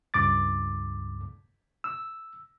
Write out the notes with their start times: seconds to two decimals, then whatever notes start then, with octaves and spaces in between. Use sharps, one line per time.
0.14 C#2 G2 D6 A6
1.84 E6